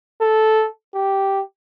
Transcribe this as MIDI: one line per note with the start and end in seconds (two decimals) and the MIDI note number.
0.22 0.68 69
0.94 1.41 67